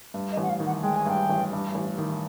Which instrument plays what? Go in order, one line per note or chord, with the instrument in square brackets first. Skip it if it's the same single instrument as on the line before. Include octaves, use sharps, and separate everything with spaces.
[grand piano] G2
[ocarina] D#5
[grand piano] A1
[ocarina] F#5
F5
[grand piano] D#3
[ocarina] F#5
[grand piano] G#3 [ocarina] G5
[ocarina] G#5
[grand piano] G2 [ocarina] G5
[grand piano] A1
G2
A1
D#3